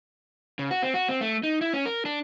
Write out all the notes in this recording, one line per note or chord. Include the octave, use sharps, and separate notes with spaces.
C#3
F#4
C4
F#4
C4
A3
D#4
E4
C#4
A#4
D4